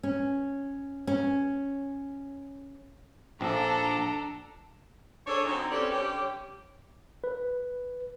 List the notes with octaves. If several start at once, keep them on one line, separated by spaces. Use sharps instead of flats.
C#4
C#4
A#1 F3 D4 A4 A#5
D4 G#4 A4 C#5
D3 F#3 C4 D#4
C4 C#4 G4 A4 B4 D5
D3 G3 C#4 G4
B4